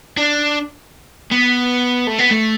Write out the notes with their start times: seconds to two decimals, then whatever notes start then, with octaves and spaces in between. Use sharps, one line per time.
0.18 D4
1.31 B3
2.07 A3
2.19 B3
2.31 A3